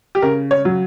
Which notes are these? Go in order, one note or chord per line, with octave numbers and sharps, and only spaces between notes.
G4
C#3 A#4
C#5
F#3